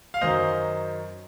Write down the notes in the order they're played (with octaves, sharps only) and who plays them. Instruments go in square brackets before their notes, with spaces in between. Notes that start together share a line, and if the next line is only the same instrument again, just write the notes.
[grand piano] F5
F#2 D#3 F#3 C5 D#5